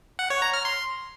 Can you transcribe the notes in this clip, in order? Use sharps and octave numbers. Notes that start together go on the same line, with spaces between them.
F#5
C#5
A#5
F6
C6